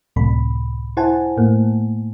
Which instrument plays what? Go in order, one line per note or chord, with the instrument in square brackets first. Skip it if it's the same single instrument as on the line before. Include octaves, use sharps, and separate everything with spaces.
[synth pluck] C#2 F#2 A2 C3 B5
E4 C5 F#5 G#5 A5
A2 A3 A#3